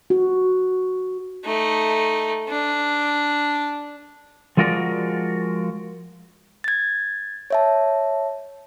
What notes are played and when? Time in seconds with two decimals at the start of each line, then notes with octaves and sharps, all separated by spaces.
0.10 F#4
1.45 A3 D#4
2.49 D4
4.57 F3 G#3 F4 F#4 A#4 D5
6.64 G#6 A6
7.50 C#5 E5 A5